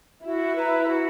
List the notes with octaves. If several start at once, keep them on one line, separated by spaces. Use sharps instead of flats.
E4 F#4
B4 E5 A#5
F#4